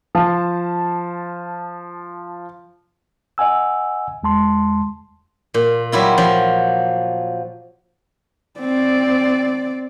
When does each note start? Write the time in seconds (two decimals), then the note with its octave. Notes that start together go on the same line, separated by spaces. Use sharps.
0.15 F3 A5
3.38 D#5 F#5 G#5 E6
4.23 E2 G#3 A5 C6
5.54 A#2
5.92 F#3 G3 E4 F4
6.18 F3 F#3
8.60 C4 D5